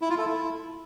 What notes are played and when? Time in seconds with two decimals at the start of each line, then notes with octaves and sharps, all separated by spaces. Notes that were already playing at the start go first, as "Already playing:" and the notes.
0.02 E4
0.10 F4
0.18 A4
0.26 E4